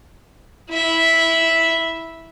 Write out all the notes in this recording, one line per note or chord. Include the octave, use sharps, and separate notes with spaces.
E4 E5